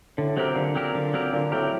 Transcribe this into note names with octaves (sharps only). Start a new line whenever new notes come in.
A2 D3
C3 F#3 C4 G4 A#4
A#2 D3
F#3 C4 G4 A#4
D3
F#3 C4 G4 A#4
A#2 D3
A2 F#3 C4 G4 A#4